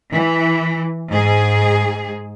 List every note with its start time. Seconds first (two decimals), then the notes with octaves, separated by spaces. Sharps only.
0.12 E3
1.09 G#2 G#4